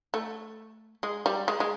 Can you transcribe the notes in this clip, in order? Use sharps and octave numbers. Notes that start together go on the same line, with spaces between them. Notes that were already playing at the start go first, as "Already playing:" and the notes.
A3
G#3
G3
G#3
G#3